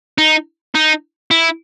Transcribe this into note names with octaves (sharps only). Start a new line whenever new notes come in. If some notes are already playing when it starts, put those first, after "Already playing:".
D#4
D#4
E4